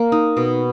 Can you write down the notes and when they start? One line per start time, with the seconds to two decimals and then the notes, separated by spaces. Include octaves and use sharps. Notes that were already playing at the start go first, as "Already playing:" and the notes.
Already playing: A#3
0.12 D#4
0.37 B2